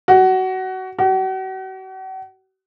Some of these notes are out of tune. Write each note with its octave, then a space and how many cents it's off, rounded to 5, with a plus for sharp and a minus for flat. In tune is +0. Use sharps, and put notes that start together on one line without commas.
F#4 +20
F#4 +40